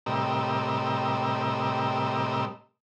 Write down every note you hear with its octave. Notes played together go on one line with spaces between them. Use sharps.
A2 C3 G3 A#4 D#5 E6